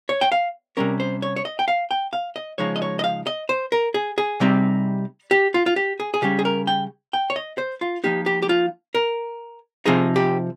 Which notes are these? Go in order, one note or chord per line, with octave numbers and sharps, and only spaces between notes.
C#5
G5
F5
C3 G3 C#4 A#4
C5
C#5
C#5
D#5
G5
F5
G5
F5
D#5
C#3 F3 G#3 D#4 C#5
D#5
C#5
D#5
F5
D#5
C5
A#4
G#4
G#4
C3 G3 C4 D#4
G4
F4
F4
G4
G#4
G#4
C#3 G3 C#4 G4
G#4
A#4
G5
G5
C#5
D#5
C5
F4
F3 A#3 D#4 G4
G4
G4
F4
A#4
C3 F3 C4 D#4 G#4
G4